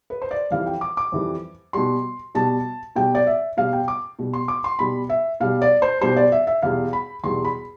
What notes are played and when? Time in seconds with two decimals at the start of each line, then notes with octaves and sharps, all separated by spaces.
0.10 B4
0.22 C5
0.31 D5
0.51 F2 E3 G3 F5
0.66 G5
0.81 D6
0.97 D6
1.12 F2 E3 G3
1.73 B2 G3 C6
2.35 B2 G3 A5
2.96 B2 G3 G5
3.15 D5
3.27 E5
3.57 B2 G3 F5
3.73 G5
3.88 D6
4.19 B2 G3
4.33 C6
4.48 D6
4.64 C6
4.79 B2 G3 B5
5.09 E5
5.40 B2 G3 F5
5.62 D5
5.82 C5
6.01 B2 G3 C5
6.16 D5
6.32 E5
6.47 E5
6.62 E2 B2 G3 F5
6.93 B5
7.24 E2 B2 G3 C6
7.44 B5